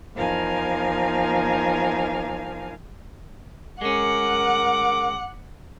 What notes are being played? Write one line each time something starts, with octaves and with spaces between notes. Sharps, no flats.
E2 F3 D#4 A#4 F5 G#5
G#3 C#4 A#4 F#5 D6